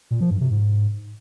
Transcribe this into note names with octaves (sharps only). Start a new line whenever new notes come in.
A#2
F3
G2
C3
G#2